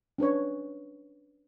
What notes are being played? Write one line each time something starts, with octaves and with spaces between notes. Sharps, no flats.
C#4 D4 B4 C#5